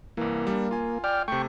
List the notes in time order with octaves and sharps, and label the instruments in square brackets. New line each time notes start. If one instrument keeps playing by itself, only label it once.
[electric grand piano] C2 E3 [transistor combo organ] A#3
[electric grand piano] G3 D4
F4 G#5
[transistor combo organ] D5 G5 F6
[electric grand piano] C3 A3 [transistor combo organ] G5 C#6